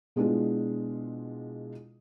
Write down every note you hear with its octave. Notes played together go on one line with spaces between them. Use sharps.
B2 G#3 B3 D4 E4 F4